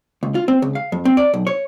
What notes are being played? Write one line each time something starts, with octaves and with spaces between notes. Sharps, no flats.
C#2
F4
C4
C#2
F5
F2
C4
D5
B1
C#5